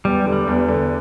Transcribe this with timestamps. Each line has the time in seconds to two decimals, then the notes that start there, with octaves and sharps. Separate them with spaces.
0.05 E2 G3
0.26 D3
0.33 G3
0.47 E2
0.68 D3